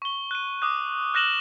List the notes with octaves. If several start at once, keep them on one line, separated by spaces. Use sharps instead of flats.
C#6 G7
F#6 D#7
D6 D#6 F#6
F6 F#6 A#6 E7 F#7 G7